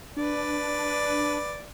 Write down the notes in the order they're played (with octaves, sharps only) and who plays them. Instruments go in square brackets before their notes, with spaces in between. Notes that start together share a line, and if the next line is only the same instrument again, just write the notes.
[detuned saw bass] D4 [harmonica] B4 D5